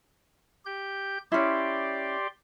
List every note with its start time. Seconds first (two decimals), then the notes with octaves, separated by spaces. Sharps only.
0.65 G4 G6
1.32 C#4 E4 G4 D5 C6